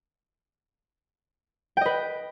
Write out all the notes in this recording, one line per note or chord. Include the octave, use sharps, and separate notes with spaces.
B4 D#5 G5